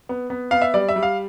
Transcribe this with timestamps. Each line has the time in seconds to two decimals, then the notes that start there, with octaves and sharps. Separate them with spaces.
0.09 B3
0.30 B3
0.51 B3 F5
0.62 E5
0.74 G3 D5
0.89 E5
0.96 G3
1.03 F5